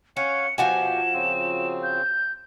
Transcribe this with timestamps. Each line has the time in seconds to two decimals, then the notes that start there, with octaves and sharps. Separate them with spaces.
0.17 C#4 C#5 F5 F#5 C#7
0.58 B2 F3 F#4 G4 G#5 E7
1.13 C#3 C4
1.83 G6